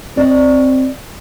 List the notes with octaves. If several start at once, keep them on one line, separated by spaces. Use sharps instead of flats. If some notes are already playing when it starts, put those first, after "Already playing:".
C4 D5 D#5